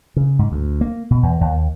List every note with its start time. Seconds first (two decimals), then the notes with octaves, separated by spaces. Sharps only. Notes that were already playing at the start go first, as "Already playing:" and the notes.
0.16 C#3
0.39 G#2
0.52 D2
0.81 A#3
1.11 B2
1.23 E2
1.41 D#2